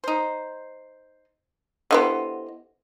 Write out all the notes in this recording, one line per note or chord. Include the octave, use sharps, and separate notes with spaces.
D#4 C5
D3 E3 B3 G4 C5 D#5